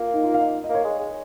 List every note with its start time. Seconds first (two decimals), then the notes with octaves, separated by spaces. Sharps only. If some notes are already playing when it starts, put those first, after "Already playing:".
Already playing: A#3 F4
0.13 D#4
0.24 F4
0.34 F5
0.39 D#5
0.64 D#5
0.69 A#3
0.75 C#5
0.84 G#3
0.99 G#3